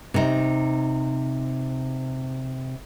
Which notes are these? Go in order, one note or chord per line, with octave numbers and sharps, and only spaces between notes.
C3 D#4